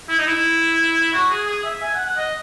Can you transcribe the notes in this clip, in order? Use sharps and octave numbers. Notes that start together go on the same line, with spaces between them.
E4
D#4
E4
F#4
G#4
G#4
E5
G#5
F#5
F#5
D#5